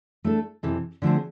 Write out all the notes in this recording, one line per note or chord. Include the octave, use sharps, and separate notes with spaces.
A3 D4 A4
F2 C3 E3
D3 F3 A3 C4 G#4